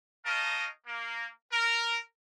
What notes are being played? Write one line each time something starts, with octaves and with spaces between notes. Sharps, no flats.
D#4 A#4 C#5 D#5 F5 A5
A#3
A#4